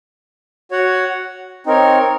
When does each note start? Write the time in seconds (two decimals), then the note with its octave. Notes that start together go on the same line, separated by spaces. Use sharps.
0.71 F#4 C#5 F#5
1.66 C4 D#4 A#4 C#5